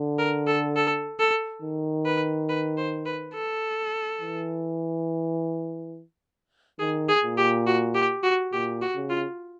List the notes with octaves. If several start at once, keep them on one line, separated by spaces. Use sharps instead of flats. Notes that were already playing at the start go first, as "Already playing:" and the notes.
Already playing: D3
A#4
A4
A4
A4
D#3
B4
B4
C5
B4
A4
E3
D#3 G#4
G#4
A#2
G4
F#4
G4
F#4
A#2 G4
F#4
C#3
F4